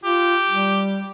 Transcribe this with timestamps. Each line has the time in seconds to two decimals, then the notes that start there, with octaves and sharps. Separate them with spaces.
0.04 F4 G4
0.49 G3